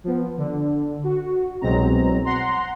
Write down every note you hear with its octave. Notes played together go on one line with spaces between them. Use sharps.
F3 B3
D3
F#4
C2 B2 F#3 G#3 C4 A#5
F#5 A#5 C6